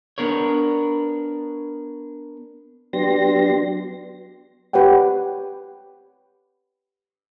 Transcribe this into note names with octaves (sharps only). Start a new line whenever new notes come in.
B3 D4 A#4 C#5
F#3 B3 D4 G4 C6 A#6
G4 B4 C#5 F#5 G5